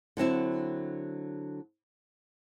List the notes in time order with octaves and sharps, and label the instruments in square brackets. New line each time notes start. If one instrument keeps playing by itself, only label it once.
[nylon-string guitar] D3 F#3 C4 E4